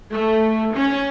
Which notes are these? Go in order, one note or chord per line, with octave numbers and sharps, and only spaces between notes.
A3
C#4